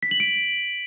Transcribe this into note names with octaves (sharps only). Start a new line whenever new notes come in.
B6
F#7
D7